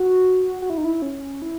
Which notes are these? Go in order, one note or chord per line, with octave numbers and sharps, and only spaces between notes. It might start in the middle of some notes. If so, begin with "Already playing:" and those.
Already playing: F#4
F#4
E4
D#4
E4
C#4
E4